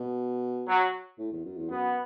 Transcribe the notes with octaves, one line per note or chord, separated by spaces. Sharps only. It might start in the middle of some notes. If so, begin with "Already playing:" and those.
Already playing: B2
F#3
A2
E2
F#2
E2
F#2 B3